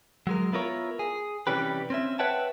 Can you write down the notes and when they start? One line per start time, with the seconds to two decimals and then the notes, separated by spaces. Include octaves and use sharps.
0.27 F#3 G#3 A#4
0.53 B3 E4 F4 A#4 C#5
0.99 G#4
1.47 C3 E3 G3 C#4 G4 B4
1.90 C4 C#4 E5
2.19 B4 C#5 E5 F#5 G5 A5